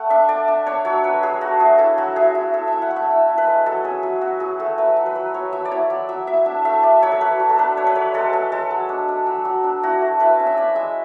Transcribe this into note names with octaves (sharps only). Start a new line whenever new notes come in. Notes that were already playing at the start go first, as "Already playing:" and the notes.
Already playing: A3 F#5
D4 E5
A3 D5
D4
D4 C#5
F#3 C#5
F#3 B4
F#3 G#4
A3 F#4
A3 G#4
E4 A4
F#3 F#4
E4 G#4
E4
E4 A4
E4 E5
F#5
A3
E5
E4
E4
B4
G#3
F#3 A4
C#4 G#4
F#3 G#4
F#3 F#4
F#3 G#4
A3 A4
F#3 B4
F#3
B4
F#3
F#3 C#5
F#3 E5
D5
E4 C#5
F#3 D5
F#3 E5
E4 E5
D4 E5
A3 E5
D4 D5
F#3 C#5
A4
F#3 B4
F#3
A4
D4 B4
D4 C#5
B4
F#3 C#5
G#3 A4
G#3 A4
G#3 A4
F#3
D4
D4
F#3
F#3
D4
E4 F#4
A3
E4 B4
C#4
E5
C#4 D5
G#3 E5